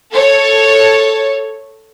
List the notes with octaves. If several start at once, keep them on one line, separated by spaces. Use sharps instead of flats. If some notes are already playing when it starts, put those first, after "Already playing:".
A4 C#5